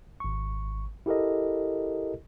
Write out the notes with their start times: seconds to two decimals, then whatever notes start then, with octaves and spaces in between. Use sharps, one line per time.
0.20 G#1 C#6
1.06 E4 G4 A4 A#4 D#5